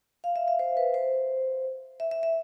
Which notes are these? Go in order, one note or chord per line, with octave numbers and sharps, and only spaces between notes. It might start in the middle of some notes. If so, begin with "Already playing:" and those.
F5
E5
E5
C5
B4
C5
E5
E5
E5